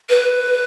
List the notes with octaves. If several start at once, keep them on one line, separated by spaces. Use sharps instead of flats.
B4